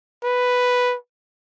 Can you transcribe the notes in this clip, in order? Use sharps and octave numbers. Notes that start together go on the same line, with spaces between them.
B4